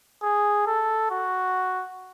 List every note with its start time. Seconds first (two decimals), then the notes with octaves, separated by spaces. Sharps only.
0.23 G#4
0.67 A4
1.10 F#4